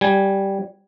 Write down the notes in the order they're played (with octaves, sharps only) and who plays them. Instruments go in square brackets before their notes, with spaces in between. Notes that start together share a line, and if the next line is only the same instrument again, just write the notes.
[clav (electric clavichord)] G3 G#5